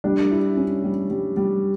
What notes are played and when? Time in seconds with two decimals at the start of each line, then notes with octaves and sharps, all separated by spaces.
0.04 G3 D4
0.31 E4
0.57 C#4
0.84 G3
1.10 G3
1.37 G3